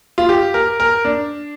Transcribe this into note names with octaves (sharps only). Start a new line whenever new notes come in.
F4
G4
A#4
A#4
D4